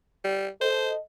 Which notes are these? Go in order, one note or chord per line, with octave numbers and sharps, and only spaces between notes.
G3
A4 C5 D#5